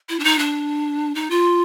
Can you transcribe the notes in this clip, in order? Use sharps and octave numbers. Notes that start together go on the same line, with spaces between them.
E4
D4
D#4
D4
D#4
F4